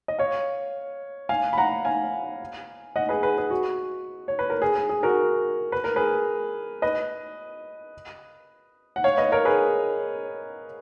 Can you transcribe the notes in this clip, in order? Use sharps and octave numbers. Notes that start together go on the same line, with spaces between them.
D#5
C#5 F5
F5 G#5
B5
F#5 A#5
F5 G#5
D#5 F#5
G#4 B4
G#4 B4
G#4
F#4
C#5
B4
A#4
G#4
G#4
G#4
F#4 A#4
B4
A#4
G#4 B4
B4 D#5
F#5
C#5 F5
B4 D#5
A#4 C#5
G#4 B4